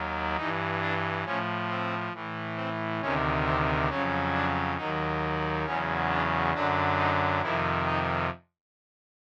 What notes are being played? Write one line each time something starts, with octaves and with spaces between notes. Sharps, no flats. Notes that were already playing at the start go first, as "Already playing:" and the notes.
Already playing: D#2 D#3 F#3
G2 E3 D#4
D4
A2 F3 C#4
C4
A2 E3
C4
D2 C3 D#3 C#4
C4
F2 C#3 F#3 C#4
D4
D#2 D#3 F#3 D#4
E2 C#3 F#3 C#4
D4
F#2 D3 F#3 D4
D#4
F2 C3 D#3 E4
D#4